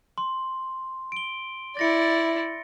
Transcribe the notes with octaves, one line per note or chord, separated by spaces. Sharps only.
C6
D7 G7
E4 D5 A6 A#6 C#7